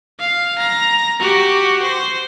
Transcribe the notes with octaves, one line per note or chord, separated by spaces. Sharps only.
F5
A#5
F#4 G4
C5